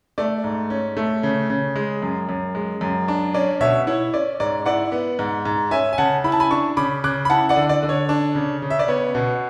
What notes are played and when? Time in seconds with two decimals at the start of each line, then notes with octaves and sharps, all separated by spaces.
0.18 A3 D5
0.44 G#2
0.70 C#4
0.97 A3
1.23 C#3
1.50 C#3
1.75 G#3
2.02 F#2
2.29 F#2
2.55 G#3
2.81 F#2
3.08 D4
3.34 C#4 D5
3.60 B2 C#5 E5
3.87 E4 C#5
4.14 C#4 D5
4.40 G#2 D5
4.66 E4 D5 F#5
4.92 B3
5.19 G#2
5.45 G#2
5.71 C#4 E5 G#5
5.93 G#5
5.98 C#3 F#5 A5
6.24 E4 B5
6.32 A5
6.40 G#5 B5
6.51 D4 A5 C#6
6.77 C#3 B5 D6
7.04 C#3 D6 F#6
7.25 B5
7.30 E4 F#5 A5
7.49 D5 F#5
7.56 D3
7.69 D5
7.83 D3
7.89 C#5
8.09 D4
8.35 C#3
8.62 C#3
8.70 E5
8.79 D5
8.88 B3 C#5
9.15 B2